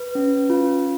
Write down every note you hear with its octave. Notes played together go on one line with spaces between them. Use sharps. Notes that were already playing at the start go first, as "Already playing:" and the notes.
Already playing: B4
C#4
F4